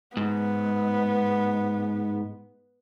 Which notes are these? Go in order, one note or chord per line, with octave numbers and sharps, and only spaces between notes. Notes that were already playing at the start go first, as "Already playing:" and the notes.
G#2 B3